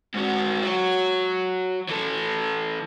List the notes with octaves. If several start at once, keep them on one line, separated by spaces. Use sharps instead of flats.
G#2 F#4
F#3 F#4
E3 A4